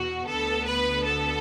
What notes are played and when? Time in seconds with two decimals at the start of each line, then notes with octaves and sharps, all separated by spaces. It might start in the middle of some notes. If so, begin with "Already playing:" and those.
Already playing: E2 B2 F#4
0.26 D2 D3 B3 A4
0.65 B4
1.03 A4